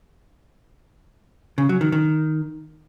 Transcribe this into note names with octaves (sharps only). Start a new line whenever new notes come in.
C#3
F#3
D#3
D#3